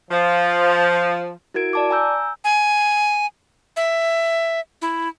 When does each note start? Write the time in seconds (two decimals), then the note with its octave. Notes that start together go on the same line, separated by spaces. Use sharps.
0.11 F3
1.54 E4 F#4 A#4 G#6 D7
1.73 D5 A5 D6
1.91 G#5 A#5 E6 G6
2.44 G#5
3.76 E5
4.82 E4